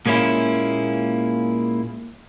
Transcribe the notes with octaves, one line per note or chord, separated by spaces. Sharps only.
A#2 G#3 A#3 C#4 E4